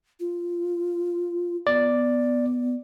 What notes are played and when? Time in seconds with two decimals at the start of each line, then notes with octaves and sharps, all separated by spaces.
0.20 F4
1.67 B3 D5